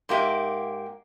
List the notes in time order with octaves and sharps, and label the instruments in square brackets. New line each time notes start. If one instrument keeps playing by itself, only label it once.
[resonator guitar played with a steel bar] G#2 A#3 G4 E5